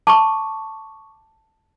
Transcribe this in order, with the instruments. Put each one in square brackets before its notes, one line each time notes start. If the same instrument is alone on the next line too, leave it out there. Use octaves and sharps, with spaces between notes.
[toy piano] A5 [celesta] C#6 D6